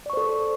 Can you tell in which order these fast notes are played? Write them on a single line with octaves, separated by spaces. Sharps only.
D5 C#6 C5 A4